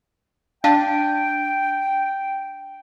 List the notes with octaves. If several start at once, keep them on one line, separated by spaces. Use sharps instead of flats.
D4 F5 G5 A5